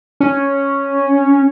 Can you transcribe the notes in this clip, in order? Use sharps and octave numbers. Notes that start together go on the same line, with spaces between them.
C#4